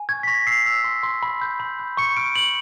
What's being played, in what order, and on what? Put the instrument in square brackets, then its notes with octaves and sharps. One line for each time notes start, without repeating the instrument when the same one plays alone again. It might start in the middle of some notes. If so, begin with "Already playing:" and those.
Already playing: [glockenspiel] G#5
C#6 G#6
B6
C#6 A#6
E6 C7
E6
C6
C6
B5
G6
B5
G6
C#6 C#7
F6 D7
C#6 F#7